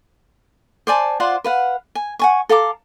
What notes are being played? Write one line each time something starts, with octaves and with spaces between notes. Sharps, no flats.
C5 D5 G#5 A5
F4 C5 D5 F#5
B4 F5 F#5
G#5
F#5 G#5 C#6
A4 F5 A#5 D6